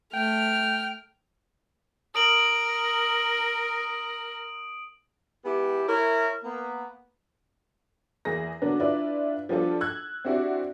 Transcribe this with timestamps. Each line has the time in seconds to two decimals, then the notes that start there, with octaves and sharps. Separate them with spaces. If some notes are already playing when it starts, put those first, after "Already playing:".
0.14 A3 G5 F6
2.15 A#4 D#6 D7 F#7
5.44 G#3 B3 E4 G4
5.87 E4 A#4 C#5
6.44 A#3 B3
8.25 E2 A#3 G#4 A#6
8.62 D3 F#3 A#3 B3 D4
8.80 D4 E4 F4 B4 D5
9.49 F3 G3 B3 D4 F4 A4
9.81 E6 F#6 G#6
10.25 C4 D4 E4 F#4 G4 D5